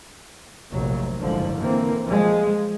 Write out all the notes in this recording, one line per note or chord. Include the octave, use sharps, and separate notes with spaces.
F1 A#1 F#3
F#1 G#2 D3 F3
D3 E3 A#3 C4
F3 G#3